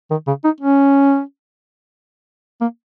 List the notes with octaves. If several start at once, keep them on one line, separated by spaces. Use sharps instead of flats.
D#3
C#3
D#4
C#4
A#3